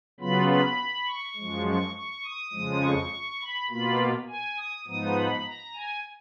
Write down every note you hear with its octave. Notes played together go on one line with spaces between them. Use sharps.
C#3 F#3 B3 F4 B5
B5
C#6
F#2 F3 G#3
C#6
C#6
D#6
F2 C#3 F3 G#3
C#6
B5
B2 A#3 F4 B5
G#5
D#6
G#2 F3 B3 D#4 D#6
B5
A#5
G#5